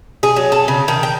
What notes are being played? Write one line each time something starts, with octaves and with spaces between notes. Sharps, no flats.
G#4
F#3
A4
C#3
D#3
G5